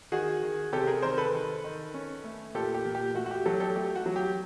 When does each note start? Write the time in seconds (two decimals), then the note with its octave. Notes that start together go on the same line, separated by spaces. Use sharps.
0.12 D#3 F#4 G#4
0.43 D#3
0.73 C3 G4 A4
0.87 G#4 A#4
1.02 D#3 A#4 C5
1.18 A4 B4
1.34 D#3
1.64 D#3
1.94 C#4
2.24 A3
2.54 A#2 G4 A4
2.74 G4
2.86 A#2
2.95 G4
3.15 A3 F#4
3.26 F#4
3.31 G4
3.45 F#3 G4 A4
3.60 G4 A4
3.76 A3 G4
3.96 F#4
4.06 F#3
4.16 G4